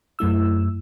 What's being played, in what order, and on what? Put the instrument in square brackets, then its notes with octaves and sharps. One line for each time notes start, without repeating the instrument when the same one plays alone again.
[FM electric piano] F#2 A3 E4 E6